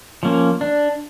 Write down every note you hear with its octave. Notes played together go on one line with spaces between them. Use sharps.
F3 A#3 C#4
D4